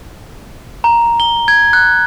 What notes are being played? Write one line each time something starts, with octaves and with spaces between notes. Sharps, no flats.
A#5
G7
G#6
F#6